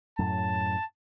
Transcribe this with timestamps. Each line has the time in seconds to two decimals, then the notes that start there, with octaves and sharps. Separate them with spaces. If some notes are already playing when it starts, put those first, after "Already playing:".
0.19 F#2 A2 F#3 A5